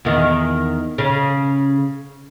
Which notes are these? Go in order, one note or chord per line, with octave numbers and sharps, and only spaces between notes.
E2 D#3
C#3